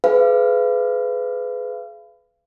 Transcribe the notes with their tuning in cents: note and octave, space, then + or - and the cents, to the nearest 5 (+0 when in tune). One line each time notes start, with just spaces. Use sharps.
G#4 +35 B4 +30 F5 -35